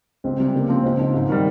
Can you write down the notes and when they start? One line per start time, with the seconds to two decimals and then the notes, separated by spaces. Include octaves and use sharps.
0.24 C#2 C4
0.39 C3 G3
0.55 C#3 A#3
0.69 F3 C4
0.83 C#2 C4
0.98 C#3 F3 D#4
1.14 G#2
1.29 D#3 G3